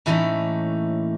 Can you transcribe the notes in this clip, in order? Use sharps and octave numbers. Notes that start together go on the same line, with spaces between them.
A2 E3 A3 A#3 C#4 D#4